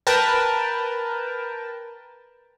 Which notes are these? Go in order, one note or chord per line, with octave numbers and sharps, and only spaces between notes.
A#4 B4 G5 A5